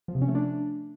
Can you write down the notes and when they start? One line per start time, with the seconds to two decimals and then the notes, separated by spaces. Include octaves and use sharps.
0.08 F3
0.15 C3
0.22 C#4
0.28 A3
0.35 D4